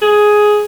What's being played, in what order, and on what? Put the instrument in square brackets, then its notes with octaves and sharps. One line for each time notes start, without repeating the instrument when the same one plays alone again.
[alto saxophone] G#4